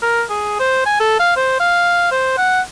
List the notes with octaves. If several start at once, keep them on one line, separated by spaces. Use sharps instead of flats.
A#4
G#4
C5
G#5
A4
F5
C5
F5
C5
F#5